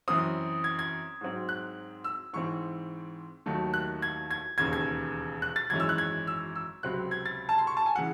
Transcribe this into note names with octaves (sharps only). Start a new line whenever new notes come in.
F#2 E3 C4 D#6
G#6
G#6
G#2 F#3 C4
F#6
E6
G#2 E3 C4 C#6
D#2 D#3 F#3 A3
F#6
G#6
G#6
E1 D#2 C#3 G#6
G#6
F#6
A6
G#1 F#2 E3 G#3 C#4 G#6
E6
F#6
G#6
E6
E6
C#2 C3 F#3 C4 F#6
G#6
A6
A5
C6
C#6
A5
G#5
C#3 E3 F#5